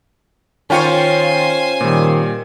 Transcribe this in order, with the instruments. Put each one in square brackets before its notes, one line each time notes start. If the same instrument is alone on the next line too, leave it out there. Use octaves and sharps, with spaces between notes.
[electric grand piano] D#3 G5 C#7 [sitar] C#4 F4 C#5 [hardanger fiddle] C5 G#5
[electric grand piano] A#2 G3 [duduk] D#3